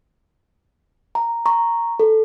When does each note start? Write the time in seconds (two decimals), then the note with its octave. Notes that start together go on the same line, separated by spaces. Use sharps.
1.15 A#5
1.46 A#5 C#6
2.00 A4